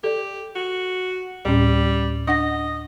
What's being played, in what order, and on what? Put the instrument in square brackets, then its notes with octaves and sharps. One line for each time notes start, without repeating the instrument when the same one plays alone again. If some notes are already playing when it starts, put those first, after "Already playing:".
[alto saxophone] G4 [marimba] A4 D5
[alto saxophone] F#4
[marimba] D2 A2 C#4 [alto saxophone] G3
[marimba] D4 F#5 A#6 [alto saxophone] D#5